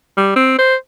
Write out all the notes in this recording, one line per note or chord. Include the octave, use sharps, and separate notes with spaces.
G3
C4
C5